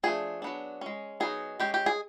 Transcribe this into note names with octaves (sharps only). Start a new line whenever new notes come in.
F3 A3 D4 G#4
F#3 B3 D4
G#3 C#4
F#3 B3 D#4 G#4
G#3 C#4 G4
G4
G#4